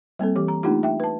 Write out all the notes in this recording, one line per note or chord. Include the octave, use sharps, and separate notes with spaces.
G3 A#3 C4 A4
E3 G4 D6
A#5
A3 A#3 D4 D#4 F4 G4
E5 G5
B4 A5